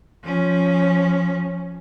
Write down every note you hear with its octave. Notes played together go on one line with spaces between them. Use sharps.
F3 C#4